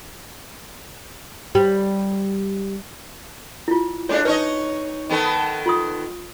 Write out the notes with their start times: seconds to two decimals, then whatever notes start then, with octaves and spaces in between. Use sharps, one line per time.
1.55 G3
3.68 E4 F4
4.09 G#3 A3 D4 C#5
4.25 D#4 B4 C#5 D#5
5.10 D#3 B3 A4
5.66 F4 C6 D#6